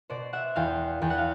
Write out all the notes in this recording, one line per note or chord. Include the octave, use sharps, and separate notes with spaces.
B2 C5 D5
E5 F#5
E2 F5 G5
E2 G5
F#5
F5